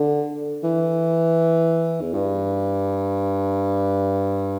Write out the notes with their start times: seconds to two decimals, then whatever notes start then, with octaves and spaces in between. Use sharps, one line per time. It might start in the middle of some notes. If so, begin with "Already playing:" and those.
Already playing: D3
0.64 E3
2.01 E2
2.14 G2